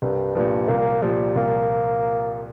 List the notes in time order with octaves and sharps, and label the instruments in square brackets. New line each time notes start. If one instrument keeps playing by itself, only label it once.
[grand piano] C2 [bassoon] G2
[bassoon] G2 [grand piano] A#2 F3
[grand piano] C2 [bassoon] A#3
[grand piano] A#2 F3 [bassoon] G3
[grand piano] C2 [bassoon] A#3